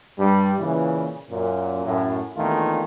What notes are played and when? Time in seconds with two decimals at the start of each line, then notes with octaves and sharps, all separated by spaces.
0.18 G2 G3
0.59 A#2 C#3 E3
1.31 F#2 A#2
1.85 F#2 A2
2.37 A#1 E2 D#3 A3 F4